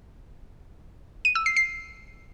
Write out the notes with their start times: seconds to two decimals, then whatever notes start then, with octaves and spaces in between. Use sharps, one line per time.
1.25 D#7
1.35 E6
1.46 C7
1.56 C7